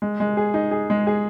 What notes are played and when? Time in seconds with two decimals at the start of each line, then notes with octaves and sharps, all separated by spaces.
0.02 G#3
0.20 G#3
0.37 G#4
0.54 D#4
0.71 G#4
0.90 G#3
1.07 G#4